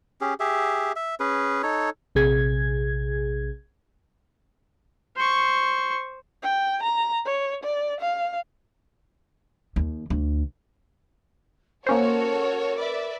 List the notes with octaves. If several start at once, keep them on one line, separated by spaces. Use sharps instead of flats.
C#4 G4 G#4
G4 G#4 E5
E5
C#4 G#4 B4
D#4 A4 C#5
A#1 C3 G#4 G#6
C5 C#6
G5
A#5
C#5
D5
F5
D#2
D2
A#3 C#4 F#4 A4 A#4 C5 C#5
B4 D5 E5